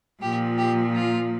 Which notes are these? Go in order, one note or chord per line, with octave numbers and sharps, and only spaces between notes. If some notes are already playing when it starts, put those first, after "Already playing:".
A#2 F3 G4
G4
F4